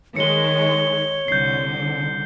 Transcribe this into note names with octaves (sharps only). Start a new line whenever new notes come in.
D#3 G#3 C#5 C#7 G7
C2 D3 G6 C7